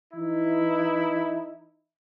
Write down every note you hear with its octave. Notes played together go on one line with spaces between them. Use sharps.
E3 D#4 E4